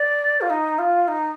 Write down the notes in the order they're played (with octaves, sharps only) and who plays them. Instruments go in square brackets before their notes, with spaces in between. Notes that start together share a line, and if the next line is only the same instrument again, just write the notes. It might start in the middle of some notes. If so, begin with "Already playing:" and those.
Already playing: [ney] D5
F4
D#4
F4
D#4